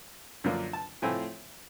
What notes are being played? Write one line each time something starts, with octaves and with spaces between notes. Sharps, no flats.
F#2 D3 F3 A#3 D4
A5
A2 F3 A3 C4 G#5